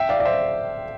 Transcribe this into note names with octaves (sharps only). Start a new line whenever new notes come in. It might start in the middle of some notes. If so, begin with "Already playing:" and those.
Already playing: E5 G5
D5 F5
D5
C5 E5